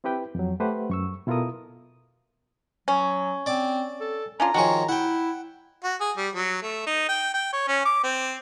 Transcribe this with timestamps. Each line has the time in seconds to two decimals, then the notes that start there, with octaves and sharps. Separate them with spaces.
0.04 C4 E4 G4 B4 G5
0.35 F2 F#3
0.60 A3 G4 B4 C5 F#5
0.90 F#2 C#6 E6
1.27 B2 E4 F4 A4 A#4 D#6
2.88 F#3 C#4
3.46 C4 D5 D6
4.00 A4
4.40 C#4 D4 F4 A#5
4.54 D#3 F3 F#4 G#4 C#5
4.89 E4 F#5 G5
5.84 F#4
6.01 G#4
6.17 G3
6.35 F#3
6.62 A3
6.87 D#4
7.09 G5
7.34 G5
7.53 C#5
7.68 C#4
7.86 D6
8.04 C4